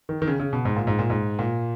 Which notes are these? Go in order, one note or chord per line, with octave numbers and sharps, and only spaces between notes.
D#3
D#3
C#3
C#3
B2
G#2
A#2
G#2
A#2
G#2
A#2